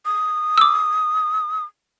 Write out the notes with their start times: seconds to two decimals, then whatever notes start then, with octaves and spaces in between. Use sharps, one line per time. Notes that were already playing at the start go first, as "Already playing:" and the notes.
0.06 D#6
0.58 D6 E6